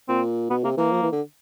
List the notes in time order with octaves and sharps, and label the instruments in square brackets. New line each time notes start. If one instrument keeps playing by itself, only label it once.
[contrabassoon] A#2 [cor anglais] C4
[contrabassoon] B2 [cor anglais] B3
[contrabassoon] C3 [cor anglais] A#3
[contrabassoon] E3 [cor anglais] A#3
[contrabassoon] F3
E3
D3